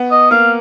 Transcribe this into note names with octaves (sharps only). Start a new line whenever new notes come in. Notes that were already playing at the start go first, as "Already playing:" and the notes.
Already playing: B3
D#5
A#3 F5